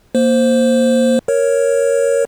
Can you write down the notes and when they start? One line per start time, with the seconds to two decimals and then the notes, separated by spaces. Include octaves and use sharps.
0.15 A#3 C5
1.28 A#4 C#5